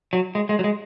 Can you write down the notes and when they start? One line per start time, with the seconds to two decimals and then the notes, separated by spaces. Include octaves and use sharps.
0.13 F#3
0.35 G#3
0.49 G#3
0.59 F#3
0.64 G#3